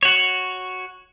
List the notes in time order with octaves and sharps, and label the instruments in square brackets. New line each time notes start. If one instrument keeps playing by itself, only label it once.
[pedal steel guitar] F#4 C#5